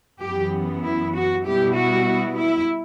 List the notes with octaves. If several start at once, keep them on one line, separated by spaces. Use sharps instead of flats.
F#2 E3 B3 G4
E4
F#4
B2 G3 B3 E4 G4
F#4
E4